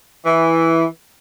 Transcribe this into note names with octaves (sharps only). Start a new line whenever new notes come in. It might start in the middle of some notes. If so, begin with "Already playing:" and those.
E3